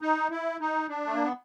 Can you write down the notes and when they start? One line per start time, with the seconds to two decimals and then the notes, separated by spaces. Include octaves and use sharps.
0.02 D#4
0.31 E4
0.60 D#4
0.89 D4
1.06 A3
1.15 A#3
1.24 B3